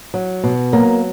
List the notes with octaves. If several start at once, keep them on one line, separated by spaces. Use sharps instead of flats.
F#3
B2
F#3 A#3